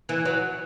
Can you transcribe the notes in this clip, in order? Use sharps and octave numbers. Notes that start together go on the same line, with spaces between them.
E3
F#3